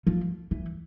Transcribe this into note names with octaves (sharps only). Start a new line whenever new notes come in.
F3
E3